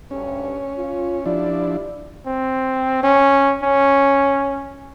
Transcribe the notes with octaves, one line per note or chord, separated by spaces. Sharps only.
D2 G2 C#4
F4
F3 D4 E4 G4 D5
C4
C#4
C#4